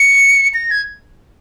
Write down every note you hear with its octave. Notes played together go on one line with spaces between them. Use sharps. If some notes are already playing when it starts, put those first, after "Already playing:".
Already playing: C#7
A#6
G#6